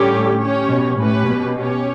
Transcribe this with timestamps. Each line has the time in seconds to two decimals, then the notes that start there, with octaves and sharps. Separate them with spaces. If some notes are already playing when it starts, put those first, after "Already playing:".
Already playing: A2 D3 G3 C#4 G4 C#5
0.39 C#4 G4 C#5
0.68 B2
0.98 A2 C#4 G4 B4
1.26 B2
1.56 C#4 G4 C#5